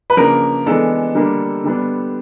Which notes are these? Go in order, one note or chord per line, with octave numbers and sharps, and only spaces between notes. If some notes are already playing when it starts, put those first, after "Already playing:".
B4
C#3 F3 A#3 D4 A#4
E3 G#3 B3 D4 A4
D3 G3 A#3 D4
D3 G3 B3 D4